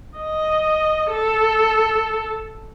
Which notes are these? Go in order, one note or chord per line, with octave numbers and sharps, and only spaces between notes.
D#5
A4